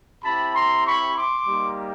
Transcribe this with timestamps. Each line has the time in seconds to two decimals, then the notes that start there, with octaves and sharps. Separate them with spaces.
0.23 C4 E4 G4 A5 B5
0.54 A#5 C6
0.85 B5 C#6
1.16 C6 D6
1.47 G3 A#3 D#4 G4